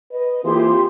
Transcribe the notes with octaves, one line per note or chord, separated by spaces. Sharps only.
B4 D#5
E3 A#3 C4 F4 G4 G#4 C6